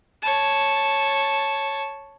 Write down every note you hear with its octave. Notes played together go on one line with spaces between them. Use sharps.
C#5 A5